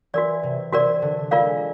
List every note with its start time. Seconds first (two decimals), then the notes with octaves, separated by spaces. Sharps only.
0.13 E3 F#4 A#4 D5
0.43 C3
0.72 C3 F#4 A#4 D5
1.02 D3
1.31 G#3 F4 A#4 D5 F5